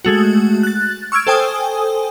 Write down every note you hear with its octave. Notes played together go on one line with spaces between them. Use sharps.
G#3 A3 F#4
F#6 A6
C#6 E6 F6 G#6 D7
A4 C5 G5 G#5 D#6